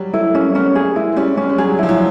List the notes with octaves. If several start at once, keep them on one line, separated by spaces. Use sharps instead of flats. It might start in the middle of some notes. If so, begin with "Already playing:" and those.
Already playing: F#3 G3
A3 E4
A#3 C#4
B3 C#4
A3 G#4
G#3 E4
G#3
G3 C#4
G#3 C#4
G3
F#3 G#4
F3 E4
F#3